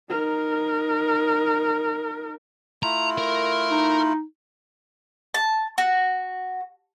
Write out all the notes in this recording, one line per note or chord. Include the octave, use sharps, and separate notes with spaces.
D#4 A#4
A3 E4 F4 A#5
A#4
D#4
A5
F#4